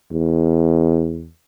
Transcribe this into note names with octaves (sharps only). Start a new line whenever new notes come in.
E2